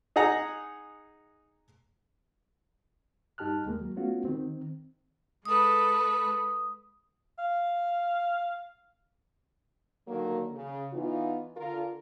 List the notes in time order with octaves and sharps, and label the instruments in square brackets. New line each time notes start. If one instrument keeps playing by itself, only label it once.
[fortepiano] D#4 G#4 F#5 A#5
[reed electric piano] G2 D#4 G4 A5 F6 F#6
D#2 G#3 A#3
F#3
G#3 A3 B3 C#4 F4 F#4
D#3 C4
[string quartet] G#3 A4 B4 [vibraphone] D#6
[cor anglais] F5
[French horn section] D3 D#3 F#3 A#3
C#3
E3 B3 D#4 F4
D3 F4 A#4